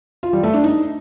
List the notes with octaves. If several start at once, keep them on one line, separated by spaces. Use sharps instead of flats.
F4
G3
A3
D4
D#4